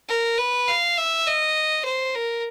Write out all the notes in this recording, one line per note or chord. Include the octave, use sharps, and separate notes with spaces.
A#4
B4
F5
E5
D#5
C5
A#4